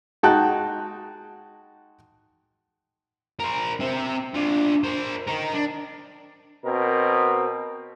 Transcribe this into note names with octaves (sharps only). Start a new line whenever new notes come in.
G#3 D#4 F#4 G5 A5 F#6
A#4 C5
C4 E5
D4 F4
A#4 C5
D#4 A#4
D4
B2 C4 A#4